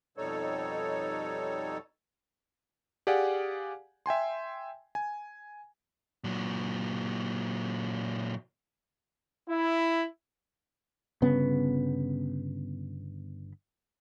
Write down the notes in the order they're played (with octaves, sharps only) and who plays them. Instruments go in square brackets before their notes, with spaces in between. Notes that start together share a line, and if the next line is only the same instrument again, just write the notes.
[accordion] F2 B2 G3 D#4 A4 C#5
[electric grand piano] G4 G#4 D5 F5 F#5 G#5
E5 G5 G#5 C6
G#5
[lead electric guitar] A#2 F#3
[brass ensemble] E4
[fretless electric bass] G1 C#3 B3